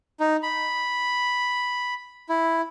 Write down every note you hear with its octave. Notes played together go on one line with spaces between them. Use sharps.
D#4
B5
E4